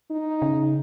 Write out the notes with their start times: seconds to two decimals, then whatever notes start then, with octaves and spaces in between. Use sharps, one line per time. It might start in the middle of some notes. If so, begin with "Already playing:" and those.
0.10 D#4
0.42 C#3